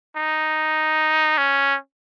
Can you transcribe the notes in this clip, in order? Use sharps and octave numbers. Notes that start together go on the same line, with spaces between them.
D#4
C#4